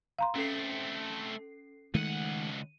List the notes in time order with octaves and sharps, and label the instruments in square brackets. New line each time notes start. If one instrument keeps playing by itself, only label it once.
[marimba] F5 A#5 C6
[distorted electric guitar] A3 C4 [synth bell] C#4 A4 C7
[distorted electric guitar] C#2 F#5 [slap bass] D#3 G#3 A3 [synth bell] D#7